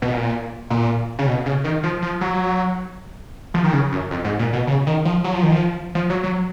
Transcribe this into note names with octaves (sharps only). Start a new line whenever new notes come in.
B2
A#2
A#2
C#3
B2
C#3
D#3
F3
F3
F#3
F3
D#3
C#3
F#2
F2
G#2
A#2
B2
C#3
D#3
F3
F#3
F3
D#3
F3
F3
F#3
F#3